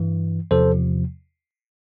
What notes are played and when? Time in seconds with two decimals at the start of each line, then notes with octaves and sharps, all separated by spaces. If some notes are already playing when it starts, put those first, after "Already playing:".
Already playing: G2 E3
0.51 E2 C3 F3 A4 C5